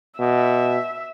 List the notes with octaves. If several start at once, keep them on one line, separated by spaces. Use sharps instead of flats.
B2 E5